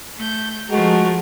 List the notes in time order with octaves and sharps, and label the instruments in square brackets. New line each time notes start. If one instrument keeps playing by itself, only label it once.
[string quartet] A3 G6
[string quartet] F3 A3 A#4 [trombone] G#3 [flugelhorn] F#4